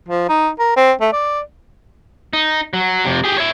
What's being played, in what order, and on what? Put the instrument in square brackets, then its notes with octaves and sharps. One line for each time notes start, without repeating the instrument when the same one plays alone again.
[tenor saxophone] F3
D#4
A#4
C4
A3
D5
[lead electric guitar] D#4
F#3
F2 C3
G4 G#4
C#5 E5